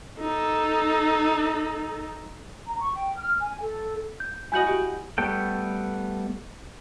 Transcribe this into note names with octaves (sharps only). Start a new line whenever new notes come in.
D#4 A4
A#5
C#6
G5
F6
G#5
A4
G6
E4 F#4 D#5 G#5 G6 F#7
F#4 G4
G3 A3 B3 A4 G5